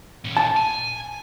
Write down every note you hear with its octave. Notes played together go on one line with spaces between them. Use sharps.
A#2 C#4
A5
G#5